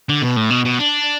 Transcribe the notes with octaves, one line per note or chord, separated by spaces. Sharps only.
D3
B2
A2
B2
B2
D4